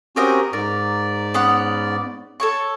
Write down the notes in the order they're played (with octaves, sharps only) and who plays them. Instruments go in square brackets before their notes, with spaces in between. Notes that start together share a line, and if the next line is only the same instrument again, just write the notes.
[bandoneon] C4 C#4 F#4 [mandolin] G4 A#4 D#5
[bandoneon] G#2 D5 [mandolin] A#4
[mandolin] B3 C#4 F#5
A4 C#5 C#6